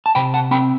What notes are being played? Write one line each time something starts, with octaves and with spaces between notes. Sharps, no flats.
A5
C3 G5 B5
F#5 A5
C4 G5 B5